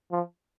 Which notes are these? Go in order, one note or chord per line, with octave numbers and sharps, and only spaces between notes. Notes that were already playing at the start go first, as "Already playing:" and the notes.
F3